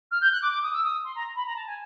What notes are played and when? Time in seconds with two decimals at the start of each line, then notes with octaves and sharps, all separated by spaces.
0.11 F6
0.21 G6
0.32 F#6
0.42 D6
0.52 D6
0.63 D#6
0.74 E6
0.84 D#6
1.05 C6
1.15 A#5
1.36 B5
1.46 A#5
1.56 A5
1.67 G#5